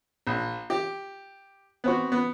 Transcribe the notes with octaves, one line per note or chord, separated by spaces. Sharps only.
A#1
G4
B3 C4 F#4
B3